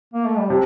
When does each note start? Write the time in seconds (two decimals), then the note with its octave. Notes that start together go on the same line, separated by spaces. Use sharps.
0.14 A#3
0.26 A3
0.38 G3
0.50 C3 F3